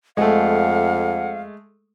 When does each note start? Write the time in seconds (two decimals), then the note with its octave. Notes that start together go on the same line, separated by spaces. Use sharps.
0.17 F2 G#3 A3 F5 F#5